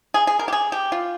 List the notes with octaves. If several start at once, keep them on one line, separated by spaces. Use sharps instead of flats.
G#4
G#4
A#4
G4
G#4
G4
F4